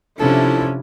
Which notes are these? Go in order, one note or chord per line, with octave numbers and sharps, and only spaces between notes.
C3 F3 C#4 D4 E4 A4